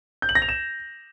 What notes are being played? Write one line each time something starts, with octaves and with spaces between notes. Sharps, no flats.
G6
F#7
A#6
F7
E7